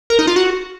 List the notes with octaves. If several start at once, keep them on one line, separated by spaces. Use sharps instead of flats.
A#4
D#4
F4
F#4